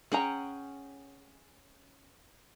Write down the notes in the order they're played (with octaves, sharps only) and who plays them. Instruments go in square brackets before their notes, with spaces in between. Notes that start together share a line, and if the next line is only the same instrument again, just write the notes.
[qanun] C#4 F#5 G5 [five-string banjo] G#4 A#5